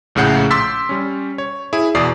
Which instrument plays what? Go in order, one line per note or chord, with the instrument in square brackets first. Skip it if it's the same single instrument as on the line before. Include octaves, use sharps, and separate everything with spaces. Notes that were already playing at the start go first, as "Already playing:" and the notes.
[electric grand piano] A#1 A2 C#3 F#5 G6
C6 D6 E6 A6 B6
G3 C#4
C#5
E4 G#4
E2 B2 D5 D#6 C7